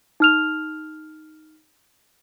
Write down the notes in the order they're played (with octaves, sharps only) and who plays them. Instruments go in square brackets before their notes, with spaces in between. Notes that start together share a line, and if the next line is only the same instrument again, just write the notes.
[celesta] D#4 F6 F7